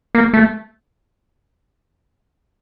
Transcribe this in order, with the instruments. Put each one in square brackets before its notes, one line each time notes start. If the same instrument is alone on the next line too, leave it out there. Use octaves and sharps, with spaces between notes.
[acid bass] A#3
A3